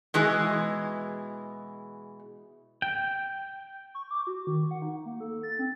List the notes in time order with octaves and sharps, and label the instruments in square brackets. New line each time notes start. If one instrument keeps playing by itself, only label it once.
[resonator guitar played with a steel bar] B2 E3 G#3
[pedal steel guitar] G5
[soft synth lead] C#6
D6
F#4
D#3
F#5
D#4
A#3
A4
A6
C4